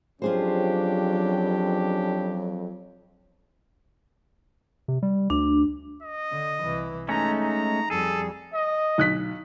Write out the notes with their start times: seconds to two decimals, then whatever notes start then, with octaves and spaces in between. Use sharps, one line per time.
0.22 F2 F#3 C#4 D4 F4 G4 G#4 C5
4.88 C3
5.03 G3
5.30 D2 D4
6.03 D#5
6.31 D3
6.62 C2 E3
7.09 G#3 A3 C#4 D#4 A#5
7.42 A#5
7.90 F2 G3 G#4 A4
8.54 D#5
8.98 B1 F#6 B6